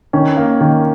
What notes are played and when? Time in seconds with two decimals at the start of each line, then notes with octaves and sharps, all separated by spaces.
0.13 D#3 C#4
0.37 A#3
0.61 D#3